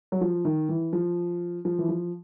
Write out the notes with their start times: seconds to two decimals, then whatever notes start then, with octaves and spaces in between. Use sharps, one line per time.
0.12 F#3
0.21 F3
0.45 D#3
0.69 E3
0.93 F3
1.65 F3
1.79 E3
1.89 F3